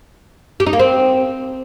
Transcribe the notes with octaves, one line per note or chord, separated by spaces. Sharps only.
G4
D#4
A#3
C4